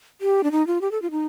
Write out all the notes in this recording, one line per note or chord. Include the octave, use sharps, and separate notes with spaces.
G4
D4
D#4
F4
G4
A4
F4
D#4